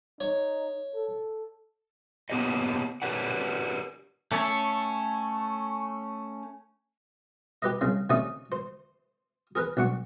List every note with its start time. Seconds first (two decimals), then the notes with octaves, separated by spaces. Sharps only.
0.21 D#4 C#5
0.94 A4
2.30 A#3 B3 G4 B4 C#5 D#5
3.02 G4 A#4 B4 C#5 D5 F#5
4.32 A3 C#4 A4 C#5
7.62 G4 B4 D#5
7.81 C2 C#3 G#3
8.10 C3 A3 C#4 D#4 D5 D#6
8.52 C5
9.55 G#4 A#4 B4
9.77 B1 D4 F#5 C#6